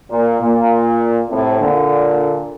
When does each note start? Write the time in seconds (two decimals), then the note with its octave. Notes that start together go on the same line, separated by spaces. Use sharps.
0.11 A#2
0.40 A#2
1.30 A2 C3
1.60 A#2 D3